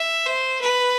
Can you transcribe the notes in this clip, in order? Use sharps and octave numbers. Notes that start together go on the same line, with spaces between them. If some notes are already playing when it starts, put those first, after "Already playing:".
Already playing: E5
C5
B4